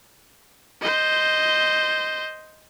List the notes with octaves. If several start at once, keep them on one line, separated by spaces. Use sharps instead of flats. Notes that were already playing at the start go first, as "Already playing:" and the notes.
C5 D#5